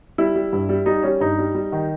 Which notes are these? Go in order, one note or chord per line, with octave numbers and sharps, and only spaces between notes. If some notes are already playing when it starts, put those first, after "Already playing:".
G3 E4
G3
G2
G3
G3 D#4
G3 C#4
G2 D#4
G3
G3
D#3